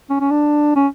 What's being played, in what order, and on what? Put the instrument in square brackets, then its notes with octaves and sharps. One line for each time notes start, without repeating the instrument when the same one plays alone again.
[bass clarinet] C#4
C#4
D4
C#4